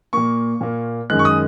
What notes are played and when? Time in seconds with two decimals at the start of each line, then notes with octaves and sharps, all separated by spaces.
0.13 A#2 A#3 C#6
0.61 A#2 A#3
1.10 F#2 D#3 G#3 F#6
1.19 C#6
1.25 D#6